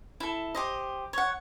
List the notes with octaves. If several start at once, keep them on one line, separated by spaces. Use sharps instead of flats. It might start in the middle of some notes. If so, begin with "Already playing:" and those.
E4 A4
G4 C5 D#5
C#5 F#5